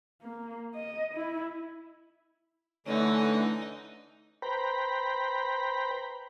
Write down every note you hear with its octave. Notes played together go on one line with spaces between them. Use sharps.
A#3
D#5
E4
D3 E3 A3 C#4 D#4
B4 C5 G5 A#5 B5